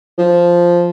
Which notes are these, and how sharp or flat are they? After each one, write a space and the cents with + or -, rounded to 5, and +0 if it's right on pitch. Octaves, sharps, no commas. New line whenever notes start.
F3 -5